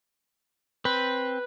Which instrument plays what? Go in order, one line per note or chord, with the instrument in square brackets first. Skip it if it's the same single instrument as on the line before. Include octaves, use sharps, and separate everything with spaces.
[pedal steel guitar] C4 [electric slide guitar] B4